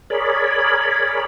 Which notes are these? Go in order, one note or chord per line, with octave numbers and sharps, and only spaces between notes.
G#4 A#4 C#5 D5 B5